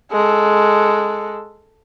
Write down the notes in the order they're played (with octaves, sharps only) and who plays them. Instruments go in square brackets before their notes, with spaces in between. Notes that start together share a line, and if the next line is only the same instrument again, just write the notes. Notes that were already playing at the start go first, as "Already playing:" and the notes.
[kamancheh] G#3 A4